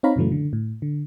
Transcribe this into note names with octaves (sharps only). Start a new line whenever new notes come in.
C4 D#4 C#5 F5 A#5 B5
F#2 A#2 C#3 E3 F#3 A3
D3
A2
D3